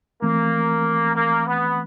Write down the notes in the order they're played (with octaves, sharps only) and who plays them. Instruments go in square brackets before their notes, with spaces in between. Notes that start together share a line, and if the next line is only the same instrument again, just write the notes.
[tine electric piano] E3 A3 C4 [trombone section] A#3
[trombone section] A#3
B3